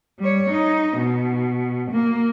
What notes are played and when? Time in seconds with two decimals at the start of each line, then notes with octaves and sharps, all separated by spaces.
0.19 G3 C#5
0.50 D#4
0.97 B2
1.91 A#3